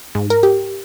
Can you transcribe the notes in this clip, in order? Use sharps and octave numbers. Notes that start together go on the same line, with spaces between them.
G#2
A#4
G4